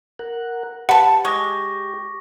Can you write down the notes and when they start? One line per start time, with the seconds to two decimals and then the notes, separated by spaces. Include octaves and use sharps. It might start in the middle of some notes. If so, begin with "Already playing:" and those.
0.19 A#4 F#5
0.89 G4 B4 F#5 A5
1.25 G#3 C#6 D6 A#6